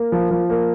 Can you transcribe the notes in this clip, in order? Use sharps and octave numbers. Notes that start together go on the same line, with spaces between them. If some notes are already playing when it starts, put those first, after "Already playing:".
Already playing: A#3
F3
F3
A#3